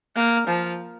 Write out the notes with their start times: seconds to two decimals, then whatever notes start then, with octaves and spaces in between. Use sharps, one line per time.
0.16 A#3
0.47 F3